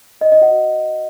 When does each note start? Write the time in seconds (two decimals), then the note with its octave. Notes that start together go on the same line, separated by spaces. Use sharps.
0.21 D5 D#5
0.32 D#5
0.41 F#4 F#5